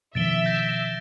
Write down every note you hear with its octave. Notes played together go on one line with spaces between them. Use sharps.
B2 D#3 F3 E5 A6 D7 G7
G6 A#6